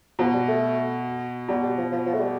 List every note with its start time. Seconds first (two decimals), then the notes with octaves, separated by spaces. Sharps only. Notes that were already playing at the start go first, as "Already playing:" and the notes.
0.19 B2 F3
0.33 G3
0.48 A3
1.48 B2 G3
1.63 G3
1.77 F3
1.91 F3
2.06 F3
2.14 A3
2.20 G3